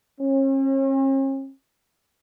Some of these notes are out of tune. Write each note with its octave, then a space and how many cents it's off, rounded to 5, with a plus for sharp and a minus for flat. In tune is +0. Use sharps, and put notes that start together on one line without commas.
C#4 -45